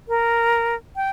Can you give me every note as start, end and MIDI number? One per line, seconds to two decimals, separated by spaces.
0.08 0.75 70
0.96 1.11 79